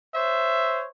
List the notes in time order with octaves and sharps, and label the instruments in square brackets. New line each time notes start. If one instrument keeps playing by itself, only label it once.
[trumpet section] C5 C#5 E5